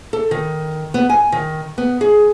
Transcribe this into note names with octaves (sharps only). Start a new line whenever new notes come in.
A4
D#3
B3
G#5
D#3
B3
G#4